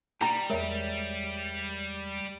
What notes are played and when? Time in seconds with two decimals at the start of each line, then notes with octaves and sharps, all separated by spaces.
0.21 G3 G5 A#5
0.50 E2 G#3 A#4 C#5 E5